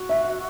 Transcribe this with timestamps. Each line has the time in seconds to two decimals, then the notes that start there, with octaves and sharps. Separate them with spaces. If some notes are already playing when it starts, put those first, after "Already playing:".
Already playing: F#4
0.09 E5